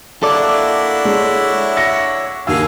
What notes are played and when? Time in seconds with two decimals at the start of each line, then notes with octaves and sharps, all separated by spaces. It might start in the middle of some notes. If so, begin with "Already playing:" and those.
0.23 A#3 D4 E4 F#4 A4 D5 E5
1.05 G#3 C#5 E5
1.77 A#6 C#7
2.47 D#2 D3 G#4 F5 E6